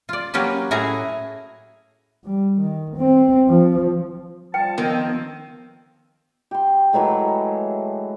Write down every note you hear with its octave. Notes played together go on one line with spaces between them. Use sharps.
F4 D5
F#3 A#3 C#4 G4 B4
A2 C#4 E4 F#4 G#4 A#5
G3
D#3
C4
F3
F3 G3 G5 A5
D#3 F3 B3 C4
G4 C6
E3 F#3 G#3 A3